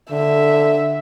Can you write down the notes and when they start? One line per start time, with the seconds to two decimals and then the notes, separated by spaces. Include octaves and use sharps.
0.11 D3 E5